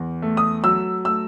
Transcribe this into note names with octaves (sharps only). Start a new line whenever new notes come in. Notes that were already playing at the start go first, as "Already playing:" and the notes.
Already playing: E2
A3
D#6
F#3 E6
A3 E6